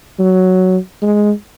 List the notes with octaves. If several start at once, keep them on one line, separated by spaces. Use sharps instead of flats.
F#3
G#3